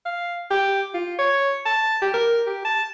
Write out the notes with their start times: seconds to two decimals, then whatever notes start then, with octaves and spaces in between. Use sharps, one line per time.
0.05 F5
0.51 G4
0.94 F4
1.19 C#5
1.65 A5
2.02 G4
2.14 A#4
2.47 G4
2.65 A5